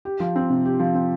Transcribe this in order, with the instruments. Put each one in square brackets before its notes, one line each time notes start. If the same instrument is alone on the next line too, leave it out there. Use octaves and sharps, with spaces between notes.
[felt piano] G4
F3
C4
C3
G4
F3
C4